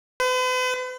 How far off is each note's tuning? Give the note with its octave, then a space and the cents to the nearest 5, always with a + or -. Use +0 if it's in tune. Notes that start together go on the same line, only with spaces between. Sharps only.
B4 +45